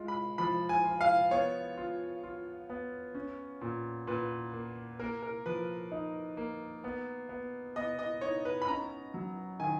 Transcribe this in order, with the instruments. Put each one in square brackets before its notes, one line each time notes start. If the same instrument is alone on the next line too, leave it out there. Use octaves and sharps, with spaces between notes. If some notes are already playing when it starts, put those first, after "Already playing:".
Already playing: [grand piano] G#3 F4
[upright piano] B5
[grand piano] F3 [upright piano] B5
[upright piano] G#5
[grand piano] F4
[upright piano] F5
[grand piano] B3 [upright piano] C#5
[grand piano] F4
F4
B3
C#4
A#2
[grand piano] A#2 [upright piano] B4
[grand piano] A#3
[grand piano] A#3 [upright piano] A#4
[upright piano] A#4
[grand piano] F3 [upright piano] B4
[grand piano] D#4
A#3
B3
B3
[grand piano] B3 [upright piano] D#5
[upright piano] D#5
[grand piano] D#4 [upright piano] C#5
[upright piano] B4
B5
[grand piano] C#4 [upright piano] A#5
[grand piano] F#3
[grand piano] D#3 [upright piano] G#5